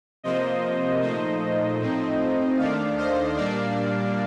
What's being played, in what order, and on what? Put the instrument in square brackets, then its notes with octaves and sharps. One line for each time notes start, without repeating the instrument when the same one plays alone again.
[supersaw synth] C3 F3 A#3 C5 D#5
A#2 F3 A3 D#4 C5 D#5
A2 F3 A3 C4 D#4
D#2 D#3 A3 D4 D5 F5
C5 D#5
A#2 G3 A#3 D4 D5 F5